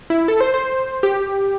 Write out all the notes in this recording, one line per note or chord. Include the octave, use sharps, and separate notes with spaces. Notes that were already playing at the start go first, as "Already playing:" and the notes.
E4
A4
C5
C5
G4